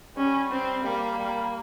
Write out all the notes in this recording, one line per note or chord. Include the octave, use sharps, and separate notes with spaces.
G3 C#4
C4
G3 A#3
G3